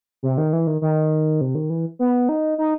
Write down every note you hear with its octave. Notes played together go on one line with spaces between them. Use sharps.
C3
D#3
E3
D#3
D#3
C3
D#3
E3
B3
D#4
D#4